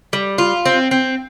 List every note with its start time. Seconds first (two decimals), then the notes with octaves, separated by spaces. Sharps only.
0.13 G3
0.38 F4
0.65 C4
0.91 C4